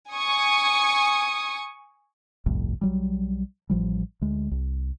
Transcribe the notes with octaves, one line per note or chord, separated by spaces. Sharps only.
G#5 C#6 D#6
G1 C2 F2 A2
B1 F#3 G3
A1 F3 G3
D2 G#3
C2